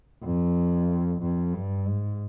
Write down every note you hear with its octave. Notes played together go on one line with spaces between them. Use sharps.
F2
F2
G2
G#2